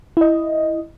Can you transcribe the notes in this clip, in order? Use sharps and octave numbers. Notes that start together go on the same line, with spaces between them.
E4 D#5